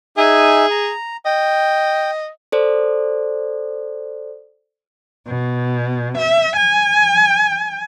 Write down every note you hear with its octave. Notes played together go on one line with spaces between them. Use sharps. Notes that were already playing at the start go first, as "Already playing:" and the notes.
D#4 G#4 E5 G#5
A#5
D#5 G5
A4 C5 D5
B2
E5
G#5